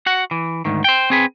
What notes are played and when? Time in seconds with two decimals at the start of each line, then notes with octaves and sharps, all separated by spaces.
0.06 F#4 F#5
0.31 E3
0.65 D2 G#2 D#3
0.84 C5 G5
1.10 C4 G#4 B4